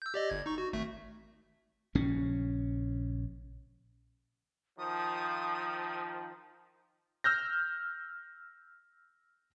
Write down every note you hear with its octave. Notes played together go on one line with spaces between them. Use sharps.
E6 G6
G4 D5 D#5
G1 G#6
D#4 C#6
F#4
G#1 A3 E5
A#1 C#3 C#4
D#3 F3 D#6
E6 F6 G6 A#6